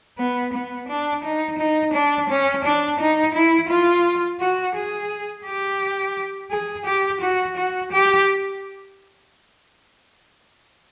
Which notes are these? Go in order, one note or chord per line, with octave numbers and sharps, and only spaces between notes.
B3
B3
D4
D#4
D#4
D4
C#4
D4
D#4
E4
F4
F#4
G#4
G4
G#4
G4
F#4
F#4
G4